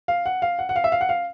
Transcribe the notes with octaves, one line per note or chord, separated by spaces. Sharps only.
F5
F#5
F5
F#5
F#5
F5
E5
F5
F#5
F5